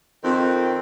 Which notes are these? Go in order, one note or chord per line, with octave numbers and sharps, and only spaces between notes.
F2 D#3 C4